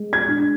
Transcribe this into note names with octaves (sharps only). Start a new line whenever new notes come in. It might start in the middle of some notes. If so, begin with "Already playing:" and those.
Already playing: G#3
G#6
D4